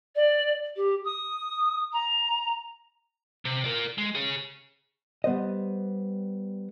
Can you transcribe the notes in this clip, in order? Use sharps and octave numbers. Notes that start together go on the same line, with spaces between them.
D5
G4
D#6
A#5
C3
A#4 D5
G#3
G#4 C#5
G3 B3 C5 D#5